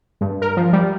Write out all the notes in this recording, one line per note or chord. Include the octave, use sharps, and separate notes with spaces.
G2
A#4
F3
G3